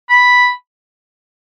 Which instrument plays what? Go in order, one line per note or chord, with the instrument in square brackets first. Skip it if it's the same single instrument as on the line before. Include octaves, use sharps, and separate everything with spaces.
[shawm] B5